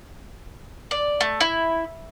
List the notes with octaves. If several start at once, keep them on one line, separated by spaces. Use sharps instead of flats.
D5
A3
E4